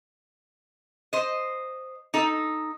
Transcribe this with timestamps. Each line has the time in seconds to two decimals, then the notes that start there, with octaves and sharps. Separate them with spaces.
1.13 C5 D#5
2.14 D#4 A4